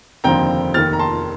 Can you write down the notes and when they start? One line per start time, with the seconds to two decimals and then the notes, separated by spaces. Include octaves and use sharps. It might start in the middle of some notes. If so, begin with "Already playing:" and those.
0.24 F1 D#2 D3 F3 C4 G5 A#5
0.74 F1 D#2 D#3 F6 A6
0.93 A#5
0.99 A5 C6